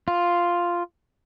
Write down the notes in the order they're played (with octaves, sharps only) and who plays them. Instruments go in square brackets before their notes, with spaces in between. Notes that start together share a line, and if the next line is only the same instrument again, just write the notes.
[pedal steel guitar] F4